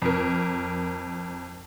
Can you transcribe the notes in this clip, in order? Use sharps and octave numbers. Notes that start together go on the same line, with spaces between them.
F2 A#4